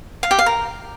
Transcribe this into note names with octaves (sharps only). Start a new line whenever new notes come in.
F5
G4
F5
A#4